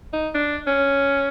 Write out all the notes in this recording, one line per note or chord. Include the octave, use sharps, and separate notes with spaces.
D#4
D4
C#4